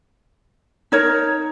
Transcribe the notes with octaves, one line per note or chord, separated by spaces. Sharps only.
D#4 A#4 C#5